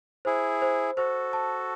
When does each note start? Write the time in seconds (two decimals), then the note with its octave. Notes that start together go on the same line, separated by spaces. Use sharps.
0.25 E4 G#4 C5
0.62 C5
0.97 F#4 A4 C5
1.33 A5